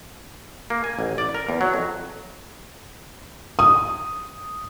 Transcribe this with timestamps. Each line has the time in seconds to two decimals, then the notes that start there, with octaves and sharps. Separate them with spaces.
0.70 A#3
0.84 G#5
0.99 A1
1.18 D5
1.34 A#4
1.49 E2
1.61 F#3
1.74 F2
3.59 D#6